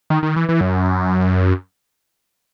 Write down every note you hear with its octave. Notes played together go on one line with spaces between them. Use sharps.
D#3
D#3
E3
E3
F#2